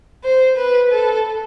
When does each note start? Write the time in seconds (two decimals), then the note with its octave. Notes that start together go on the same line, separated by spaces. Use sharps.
0.24 C5
0.57 B4
0.92 A4